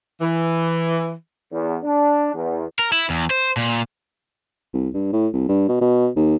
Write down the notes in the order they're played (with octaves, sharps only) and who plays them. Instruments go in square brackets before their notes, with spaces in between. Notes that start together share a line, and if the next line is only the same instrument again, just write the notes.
[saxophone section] E3
[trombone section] E2
D4
E2
[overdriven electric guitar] A#4
E4
E2
C5
A#2
[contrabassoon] C2
G2
A2
C2
G2
B2
B2
D#2